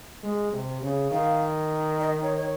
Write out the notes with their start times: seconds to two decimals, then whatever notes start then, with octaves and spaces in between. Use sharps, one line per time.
0.23 G#3
0.52 C3
0.82 C#3
1.11 D#3 F5
2.00 D#5
2.23 C#5
2.36 C#5